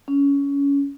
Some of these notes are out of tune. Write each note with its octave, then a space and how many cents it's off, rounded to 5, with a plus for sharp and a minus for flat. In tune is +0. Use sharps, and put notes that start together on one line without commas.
C#4 +20